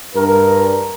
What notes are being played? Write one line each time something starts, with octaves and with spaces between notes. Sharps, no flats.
G2 A#4